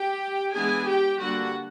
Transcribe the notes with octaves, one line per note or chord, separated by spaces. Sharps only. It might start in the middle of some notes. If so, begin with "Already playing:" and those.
Already playing: G4 G5
E3 G#3 B3 D4 G#4 G#5
G4 G5
D3 G3 A#3 D4 F#4 F#5